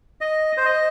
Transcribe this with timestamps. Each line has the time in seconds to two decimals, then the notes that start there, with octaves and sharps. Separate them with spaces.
0.21 D#5
0.57 C5
0.65 D#5